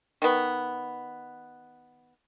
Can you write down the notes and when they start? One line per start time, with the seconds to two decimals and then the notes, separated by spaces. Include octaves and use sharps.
0.22 D#3 B3